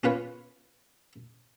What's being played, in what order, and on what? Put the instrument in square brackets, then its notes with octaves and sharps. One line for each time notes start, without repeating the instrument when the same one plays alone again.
[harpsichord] C#4 F4 B4 C#5